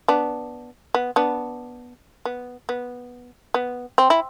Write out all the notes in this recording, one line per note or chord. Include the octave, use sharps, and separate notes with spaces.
B3 D4
B3
B3 D4
B3
B3
B3
C4
E4